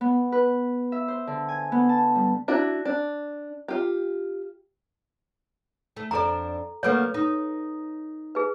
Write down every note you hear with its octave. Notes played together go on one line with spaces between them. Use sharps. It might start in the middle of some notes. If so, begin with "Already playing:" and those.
B3
B4
E5
C5
D3
G#5
B3
A5
G3
D4 E4 F#4
D4
F4 G4
A3
F2 D4 A4 D5 A#5
D3 F#3 A#3 A4 B4 C#5
D#4
G#4 B4